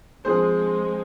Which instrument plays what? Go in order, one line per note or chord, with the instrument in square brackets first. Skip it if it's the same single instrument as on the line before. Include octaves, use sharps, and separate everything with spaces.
[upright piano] F3 C4 G#4 C5 [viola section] G#3